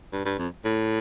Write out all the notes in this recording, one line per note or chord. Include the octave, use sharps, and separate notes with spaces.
G2
G2
F2
A2